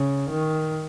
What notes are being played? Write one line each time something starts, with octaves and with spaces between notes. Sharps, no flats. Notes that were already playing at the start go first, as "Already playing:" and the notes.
Already playing: C#3
D#3